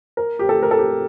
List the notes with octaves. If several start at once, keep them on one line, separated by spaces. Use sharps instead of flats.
A#4
G4
A4
A#4
A4
G4